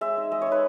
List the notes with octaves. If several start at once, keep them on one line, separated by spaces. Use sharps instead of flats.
G#3 E5
D#4
G#3 D#5
D#4 C#5
B4